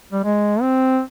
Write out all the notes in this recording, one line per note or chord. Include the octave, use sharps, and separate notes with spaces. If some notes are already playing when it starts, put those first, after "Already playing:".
G3
G#3
C4